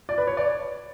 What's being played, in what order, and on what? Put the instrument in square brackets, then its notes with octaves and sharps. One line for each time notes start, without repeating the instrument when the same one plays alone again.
[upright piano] D5
B4
C#5
D5